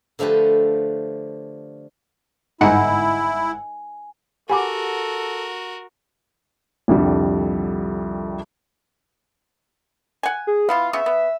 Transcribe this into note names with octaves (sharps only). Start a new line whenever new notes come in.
D3 F3 A3 G4 B4
G1 G#2 D#4 E4 F#5 G#5
F#4 G4 A4 A#4 F#5 G#5 B5 D6
C2 F2 D3 G3
F#5 G#5
G#4
B3 E4 F4 F5
C#3 B3 C#4 E5
B3